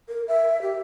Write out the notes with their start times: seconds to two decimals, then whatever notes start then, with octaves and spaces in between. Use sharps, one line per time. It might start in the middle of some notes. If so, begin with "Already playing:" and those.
0.09 A#4
0.28 E5
0.62 G4